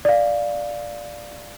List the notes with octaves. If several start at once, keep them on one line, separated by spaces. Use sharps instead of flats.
D5 F5